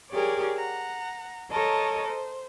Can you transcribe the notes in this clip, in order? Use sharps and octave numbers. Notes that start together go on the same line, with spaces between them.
G4 G#4 A#4 C#5 D5
F#5 A#5
A4 A#4 C#5 D#5 A5
C5